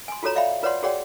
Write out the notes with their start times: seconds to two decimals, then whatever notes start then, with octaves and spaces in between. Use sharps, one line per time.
0.08 G#5 C6
0.23 F4 F#4 A4 C#5 A#5
0.36 D5 E5 F5 G5 B5
0.63 F4 B4 C#5 D5 F#5 C6
0.83 F#4 G#4 C#5 D5 F#5 G5